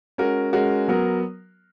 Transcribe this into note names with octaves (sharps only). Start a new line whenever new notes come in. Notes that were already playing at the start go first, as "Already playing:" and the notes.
G#3 C#4 F#4 A#4
G#3 C#4 F#4 A#4
F#3 B3 F#4 A#4